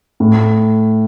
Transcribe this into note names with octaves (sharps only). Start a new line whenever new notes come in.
A2